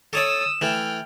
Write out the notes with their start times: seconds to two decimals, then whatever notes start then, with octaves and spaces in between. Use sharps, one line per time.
0.13 A4 C#5 D5 D#6 E6 E7
0.61 E3 A3 G5 F6